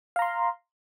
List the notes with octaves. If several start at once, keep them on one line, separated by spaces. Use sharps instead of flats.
F5 A#5 C6